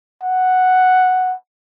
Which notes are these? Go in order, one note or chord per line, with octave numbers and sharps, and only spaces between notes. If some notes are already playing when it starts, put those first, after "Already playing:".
F#5